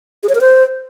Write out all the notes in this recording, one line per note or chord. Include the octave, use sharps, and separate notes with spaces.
G#4
C#5
A#4
C5